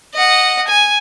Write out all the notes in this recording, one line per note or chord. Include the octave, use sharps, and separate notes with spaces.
D#5 F#5
G#5